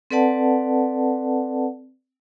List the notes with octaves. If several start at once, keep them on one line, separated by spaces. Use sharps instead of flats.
C4 A4 B4 D5 F#5 A5